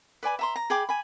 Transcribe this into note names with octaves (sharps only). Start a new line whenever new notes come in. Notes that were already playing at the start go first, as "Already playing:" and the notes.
B4 D5 G#5 B5
E5 A#5 C6
A#5
G#4 G5 B5 D6
G#5 B5